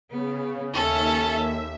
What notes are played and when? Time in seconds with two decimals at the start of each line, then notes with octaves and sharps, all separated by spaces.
0.10 C#3 B3
0.72 D#2 C#4 A4 E5